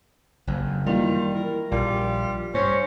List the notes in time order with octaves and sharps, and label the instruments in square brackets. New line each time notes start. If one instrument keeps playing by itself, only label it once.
[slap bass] F#1 F2
[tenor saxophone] D#3 [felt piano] E3 A#3 D5 [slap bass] G3 [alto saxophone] F4
[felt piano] E4 [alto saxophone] A#4
[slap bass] A#1 [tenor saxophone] G3 [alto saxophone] F4 [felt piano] A#4
[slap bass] G2 [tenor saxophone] C#4 [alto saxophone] C5